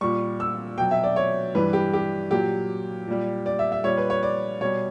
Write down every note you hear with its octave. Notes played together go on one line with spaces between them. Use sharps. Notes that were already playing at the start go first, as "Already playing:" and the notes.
A#2 G3 C#6
E6
B2 F#3 G5
E5
D5
C#5
G2 E3 G3 B4
G4
G4
A#2 F#3 G4
A#2 G3
D5
E5
E5
A#2 G3 C#5
B4
C#5
D5
B2 G3 C#5